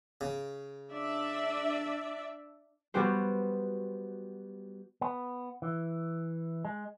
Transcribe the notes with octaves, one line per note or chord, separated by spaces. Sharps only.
C#3
D4 D5 E5
G3 B3 F#4 G4 C5
B3
E3
G#3